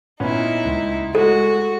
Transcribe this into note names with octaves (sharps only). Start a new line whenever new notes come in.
A#2 B3 C#4 D#4 E4
C#2
G#3 A3 F#4 A4